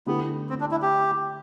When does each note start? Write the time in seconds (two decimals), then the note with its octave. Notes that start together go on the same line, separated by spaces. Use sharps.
0.07 D3 A3 B3 E4 G4
0.49 C4
0.61 D4
0.71 E4
0.82 G4